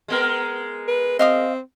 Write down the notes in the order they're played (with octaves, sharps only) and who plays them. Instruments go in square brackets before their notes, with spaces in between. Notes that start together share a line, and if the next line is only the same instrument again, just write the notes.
[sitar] G#3 B3 A#4
[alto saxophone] B4
[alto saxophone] C4 [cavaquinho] D#5 F5 D#6